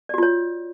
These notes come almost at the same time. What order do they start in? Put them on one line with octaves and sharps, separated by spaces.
D5 F#4 F4 C#5